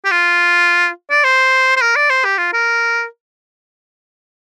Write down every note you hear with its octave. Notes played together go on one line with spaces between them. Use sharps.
G4
F4
D5
C5
C5
A#4
D5
C5
G4
F4
A#4